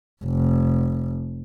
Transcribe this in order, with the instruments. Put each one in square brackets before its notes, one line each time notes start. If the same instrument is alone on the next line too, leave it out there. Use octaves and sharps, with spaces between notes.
[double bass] F1